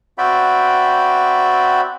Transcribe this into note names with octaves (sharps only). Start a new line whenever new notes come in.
C4 F#4 D5 E5 G5 B5